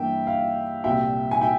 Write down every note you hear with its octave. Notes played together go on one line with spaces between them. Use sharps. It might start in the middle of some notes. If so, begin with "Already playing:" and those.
Already playing: G2 E3 A#3 E5 G5
F5
C2 A#2 G3 E5 G5
G#5
E5 G5